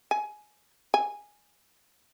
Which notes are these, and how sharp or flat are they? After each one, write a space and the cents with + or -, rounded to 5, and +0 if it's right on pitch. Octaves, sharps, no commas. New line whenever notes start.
G#5 +20
G#5 -5